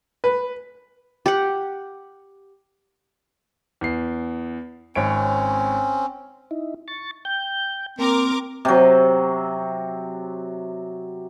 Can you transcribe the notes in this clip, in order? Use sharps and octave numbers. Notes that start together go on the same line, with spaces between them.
B4
G4 F#5
E2 C7
G#1 C4 C#4 C#5 D7
D#4 E4
C#6 A6
G5 G6
A#3 C4 A#4 D6
C3 F#3